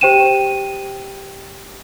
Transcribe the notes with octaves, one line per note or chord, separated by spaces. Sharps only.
G4 C5 G5 D#7 E7